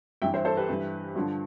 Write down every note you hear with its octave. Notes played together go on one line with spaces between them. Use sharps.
G2 E3 E5 G5
C5 E5
A4 C5
G4 B4
G2 E3
G2 D3 F3